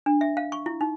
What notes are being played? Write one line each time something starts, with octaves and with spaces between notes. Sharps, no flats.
D4
E5
F5
C#6
E4
D#4